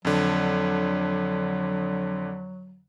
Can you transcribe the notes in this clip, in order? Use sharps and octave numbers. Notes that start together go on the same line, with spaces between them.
F2 D3 F#3